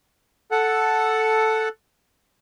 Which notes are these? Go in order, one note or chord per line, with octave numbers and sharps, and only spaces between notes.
A4 F#5